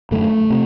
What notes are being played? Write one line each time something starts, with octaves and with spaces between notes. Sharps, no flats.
F#2 D3 A3
C3